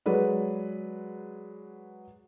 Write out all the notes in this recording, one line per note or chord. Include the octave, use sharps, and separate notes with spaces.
F#3 G#3 B4 D5